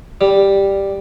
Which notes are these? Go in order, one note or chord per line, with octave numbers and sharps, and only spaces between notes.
G3